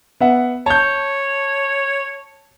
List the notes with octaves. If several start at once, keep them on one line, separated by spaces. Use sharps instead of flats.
B3 E5 F#5
C#5 A5 G6